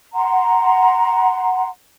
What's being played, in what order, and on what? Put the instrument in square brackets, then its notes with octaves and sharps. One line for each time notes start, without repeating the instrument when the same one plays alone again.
[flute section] F#5 A#5 C6